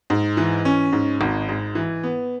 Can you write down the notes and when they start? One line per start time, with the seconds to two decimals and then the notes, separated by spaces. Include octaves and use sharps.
0.10 G#2
0.37 E3
0.65 C#4
0.92 G#2
1.21 G#1
1.49 G#2
1.75 E3
2.03 B3